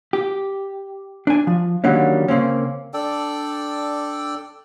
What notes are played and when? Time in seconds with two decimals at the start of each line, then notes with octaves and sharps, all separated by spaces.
0.13 G4
1.27 D4 G#5
1.47 F3
1.84 D3 D#3 F#3 G3 A#3 C#4
2.28 C#3 A#3 C4 C#4
2.94 D4 A4 D5 G5